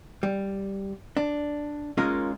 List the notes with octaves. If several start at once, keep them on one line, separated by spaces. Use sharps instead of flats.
G3
D4
G#3 A#3 C#4 D#4 F4 A#4